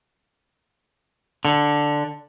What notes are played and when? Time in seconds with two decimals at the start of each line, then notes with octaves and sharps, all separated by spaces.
1.45 D3